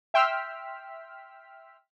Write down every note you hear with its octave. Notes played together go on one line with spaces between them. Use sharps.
E5 G5 C6 E6 F6 B6